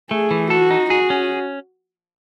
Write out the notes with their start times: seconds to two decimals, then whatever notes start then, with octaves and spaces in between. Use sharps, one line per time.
0.11 A3 G#4
0.31 E3
0.50 F#4 A4
0.71 D#4
0.90 F#4 G#4
1.10 C#4